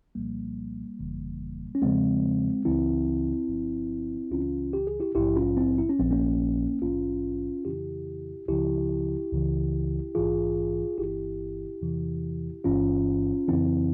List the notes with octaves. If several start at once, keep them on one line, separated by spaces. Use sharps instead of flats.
C2 A#2 F3 G3 A#3
G1 F2 C#3 E3
C#4
E2 C#3 F3 G#3 C4
C#2 C#3 E3 C4 E4
G1 G2 F3
C#2 C#3 E3 C#4 F4
G4
G#4
E4 G4
A#1 G#2 F3 E4 G4
C#4 F4
C4 E4
E4
C#4
A#1 A#2 F3 C4
A#3 C#4
A#1 G#2 E3 C#4 F4
F2 C#3 E3 E4 G4
C#2 C#3 F3 E4 G4
C#2 C#3 E3
A#1 G#2 E3 F4 G#4
G1 G2 E3 E4 G4
E2 C3 E3
G1 G2 E3 C#4 F4
F2 C#3 E3 C4 E4